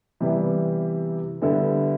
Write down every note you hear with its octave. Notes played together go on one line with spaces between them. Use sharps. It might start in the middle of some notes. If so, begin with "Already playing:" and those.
C3 E3 G3 B3
D3 G3 B3 E4 A4